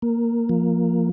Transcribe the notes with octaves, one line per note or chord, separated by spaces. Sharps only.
A#3
F3